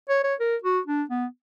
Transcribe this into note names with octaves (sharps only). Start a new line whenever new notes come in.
C#5
C#5
A#4
F#4
D4
B3